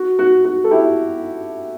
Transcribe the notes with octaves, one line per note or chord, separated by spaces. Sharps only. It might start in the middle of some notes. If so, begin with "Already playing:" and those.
Already playing: F#4
F#4
F#4
A4
E4 G4